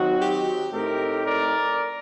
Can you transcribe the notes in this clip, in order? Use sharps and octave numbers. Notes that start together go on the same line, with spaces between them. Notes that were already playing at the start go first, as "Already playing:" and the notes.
Already playing: D#3 F#3 C4 D#4 F#4
G4
A2 A3 C4 D#4 G4 A#4
A#4 D5